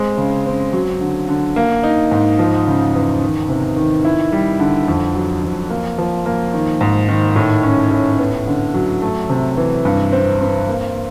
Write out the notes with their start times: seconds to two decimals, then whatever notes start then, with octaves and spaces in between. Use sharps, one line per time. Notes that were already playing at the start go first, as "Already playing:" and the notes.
Already playing: G#3 C4
0.17 C#3
0.46 C4
0.73 F#3
1.01 D3
1.29 D3
1.56 A#3
1.83 D#4
2.11 G#2
2.39 F3
2.67 C#3
2.95 E2
3.21 D#3
3.49 C3
3.77 D#3
4.05 E4
4.32 G3
4.60 D3
4.88 F2
5.15 F#3
5.43 F2
5.70 A#3
5.98 F3
6.26 A#3
6.54 D#3
6.81 G#2
7.09 D#3
7.36 A2
7.63 C#4
7.91 A2
8.19 B3
8.47 D3
8.74 F#3
9.02 A3
9.30 C3
9.57 E3
9.85 G2
10.12 C4
10.41 C4
10.68 A#3